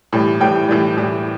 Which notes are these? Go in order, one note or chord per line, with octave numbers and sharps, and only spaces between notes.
A2 E3 G3
A2 E3 G3 G5
A2 E3 G3
A2 E3 G3